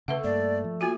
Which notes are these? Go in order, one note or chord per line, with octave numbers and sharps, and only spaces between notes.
C#3 A3 A4 B4 E5 F#5
G2 A#3 D5
F3
A#3 F4 F#4 G#5